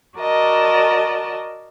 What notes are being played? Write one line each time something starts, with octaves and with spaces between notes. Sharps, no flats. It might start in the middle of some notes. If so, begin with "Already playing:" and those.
F#4 A#4 D5 D#5 A5